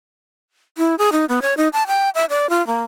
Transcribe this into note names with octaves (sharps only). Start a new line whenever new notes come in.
E4
G#4
D#4
B3
C#5
D#4
A5
G5
E5
D5
F4
A#3